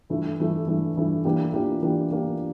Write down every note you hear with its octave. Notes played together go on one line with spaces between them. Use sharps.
G2 E3 A3
G2 E3 A3
G2 E3 A3
G2 E3 A3
E3 A#3 D4 G4
E3 A#3 D4 G4
E3 A#3 D4 G4
E3 A#3 D4 G4